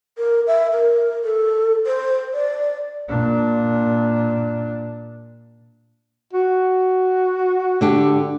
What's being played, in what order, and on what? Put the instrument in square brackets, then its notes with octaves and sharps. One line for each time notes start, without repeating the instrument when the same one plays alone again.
[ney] A#4
E5
A#4
A4
C5
D5
[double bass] A#2 D4
[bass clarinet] F#4
[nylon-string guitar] D3 D4 G4